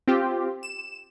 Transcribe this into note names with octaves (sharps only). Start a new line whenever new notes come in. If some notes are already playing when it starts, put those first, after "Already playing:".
C4 F4 G4
E7